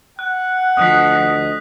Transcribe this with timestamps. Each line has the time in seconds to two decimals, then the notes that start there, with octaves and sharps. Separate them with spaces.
0.19 F#5 F#6
0.77 D2 F3 D#5 D#6 F#6 B6